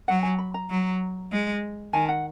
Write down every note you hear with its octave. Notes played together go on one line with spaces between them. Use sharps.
F#3 F#5
G#5
B5
A#5
F#3
G#3
D#3 G#5
F#5